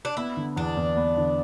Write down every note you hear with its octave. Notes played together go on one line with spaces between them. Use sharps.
D4
B3 E4
D3
E2 D4
E2
B3
D3